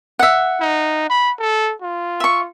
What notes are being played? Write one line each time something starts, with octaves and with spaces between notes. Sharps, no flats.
E5 F#5
D#4
B5
A4
F4
E5 C#6